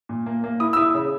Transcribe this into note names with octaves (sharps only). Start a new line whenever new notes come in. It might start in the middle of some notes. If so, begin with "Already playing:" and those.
A#2
A#3
A#3
E4 D#6
E6
E4 D#6
C#3